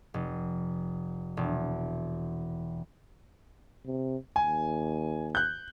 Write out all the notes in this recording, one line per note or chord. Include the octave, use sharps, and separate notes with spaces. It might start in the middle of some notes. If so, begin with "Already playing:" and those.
F1
E1
C3
D#2 G#5
F#6 G6